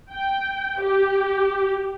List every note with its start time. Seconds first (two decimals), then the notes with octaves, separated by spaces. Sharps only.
0.10 G5
0.79 G4